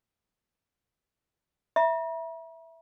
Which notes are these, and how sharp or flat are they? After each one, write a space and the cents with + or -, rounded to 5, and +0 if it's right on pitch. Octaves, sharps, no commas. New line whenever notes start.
E5 +0 A#5 +45